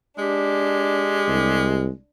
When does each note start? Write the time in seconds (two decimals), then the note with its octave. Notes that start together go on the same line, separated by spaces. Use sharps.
0.18 G#3 D4 G4
1.28 C2